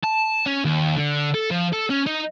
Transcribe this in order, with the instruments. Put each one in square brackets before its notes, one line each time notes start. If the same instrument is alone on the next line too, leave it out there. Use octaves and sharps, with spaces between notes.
[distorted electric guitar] A5
C#4
D#2
D3
A4
F3
A4
C#4
D#4